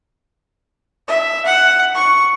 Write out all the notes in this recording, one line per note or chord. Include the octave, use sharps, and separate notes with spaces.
E5
F#5
C#6